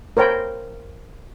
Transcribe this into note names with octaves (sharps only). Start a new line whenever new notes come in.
A#4 C5 C#5 G5 B5